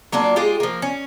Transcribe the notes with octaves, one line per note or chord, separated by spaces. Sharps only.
F#3 A#3 D4 F4
G#3 F4 G4 G#4
F3 A#3
C#4